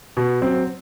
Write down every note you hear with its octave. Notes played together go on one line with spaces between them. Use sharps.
B2
F#3 C4